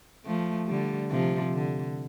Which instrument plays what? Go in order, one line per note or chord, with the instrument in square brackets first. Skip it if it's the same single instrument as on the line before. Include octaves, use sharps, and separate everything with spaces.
[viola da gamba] F3 A3
D3 G3
C3 F3
D3